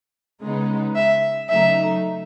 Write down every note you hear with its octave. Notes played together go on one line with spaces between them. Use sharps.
C#3 G#3 B3 D#4
E5
C#3 F#3 A3 D#4 E5